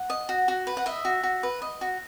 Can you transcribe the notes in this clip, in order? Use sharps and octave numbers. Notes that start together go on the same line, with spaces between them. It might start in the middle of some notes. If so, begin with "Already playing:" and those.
Already playing: F#5
D#5
F#4
F#4
B4
F#5
D#5 E5
F#4
F#4
B4
D#5
F#4